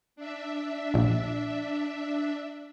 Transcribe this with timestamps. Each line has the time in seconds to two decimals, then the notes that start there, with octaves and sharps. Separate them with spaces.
0.16 D4 E5
0.94 A#1